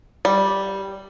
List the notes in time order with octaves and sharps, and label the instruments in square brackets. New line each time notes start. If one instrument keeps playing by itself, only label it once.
[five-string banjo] G3